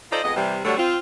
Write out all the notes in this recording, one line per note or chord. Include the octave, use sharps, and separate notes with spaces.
F4 A4 C5 D5 D#5
F2 G#3 B3 D#5
C3 E3 G3
D3 F#3 G3 A3 C#5
C4 F4